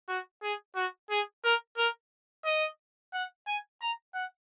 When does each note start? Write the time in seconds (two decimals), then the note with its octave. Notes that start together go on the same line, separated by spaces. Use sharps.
0.08 F#4
0.43 G#4
0.75 F#4
1.10 G#4
1.44 A#4
1.77 A#4
2.45 D#5
3.13 F#5
3.47 G#5
3.81 A#5
4.14 F#5